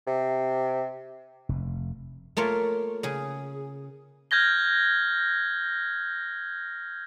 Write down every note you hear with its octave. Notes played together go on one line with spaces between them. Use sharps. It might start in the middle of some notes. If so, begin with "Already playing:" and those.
C3
F1
A3 A#3 F4 C#5
C#3 G#4
F6 G6 G#6 A#6 G7